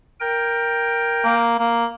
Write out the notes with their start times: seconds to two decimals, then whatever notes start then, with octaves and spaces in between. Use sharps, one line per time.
0.20 A#4 G5
1.24 A#3
1.59 A#3